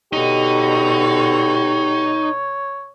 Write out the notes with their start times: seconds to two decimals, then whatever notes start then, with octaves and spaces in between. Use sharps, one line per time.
0.13 B2 D3 D#4 F#4 G4 C#5